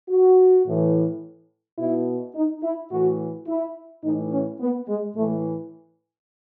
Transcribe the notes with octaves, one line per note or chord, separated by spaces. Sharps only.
F#4
A2 E3
B2 E4
D#4
E4
A2 E3 F#4
E4
A2 E3 D#4
C#4
B3
G#3
A2 E3 A3